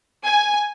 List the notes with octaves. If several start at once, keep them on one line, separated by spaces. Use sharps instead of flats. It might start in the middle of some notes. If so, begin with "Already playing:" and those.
G#5